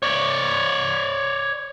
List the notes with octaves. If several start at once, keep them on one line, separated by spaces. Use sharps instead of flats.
C#5 D5